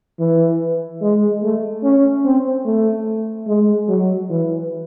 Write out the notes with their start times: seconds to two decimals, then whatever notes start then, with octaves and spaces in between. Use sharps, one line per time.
0.19 E3
1.01 G#3
1.43 A3
1.83 C#4
2.25 C4
2.66 A3
3.48 G#3
3.89 F#3
4.30 E3